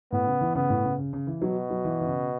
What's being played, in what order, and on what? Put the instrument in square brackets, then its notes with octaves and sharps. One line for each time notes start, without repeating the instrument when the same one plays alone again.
[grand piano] A2 [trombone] B3
[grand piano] C#3
E3
[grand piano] C#3 [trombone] B3
[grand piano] A2
C#3
C#3
C#3
E3
[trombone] B2 [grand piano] F#3
[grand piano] F#3
E3
E3
C#3